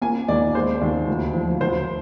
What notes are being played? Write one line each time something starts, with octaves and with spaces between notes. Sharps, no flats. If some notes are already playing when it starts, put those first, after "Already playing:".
A#3 G#5
D#2 D5
G#3 C5
D#2
D2
F3
D2 C5